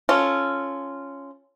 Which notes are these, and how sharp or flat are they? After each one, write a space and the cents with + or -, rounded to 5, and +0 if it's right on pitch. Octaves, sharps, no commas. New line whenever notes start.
C#4 +0 F4 -10 A4 +0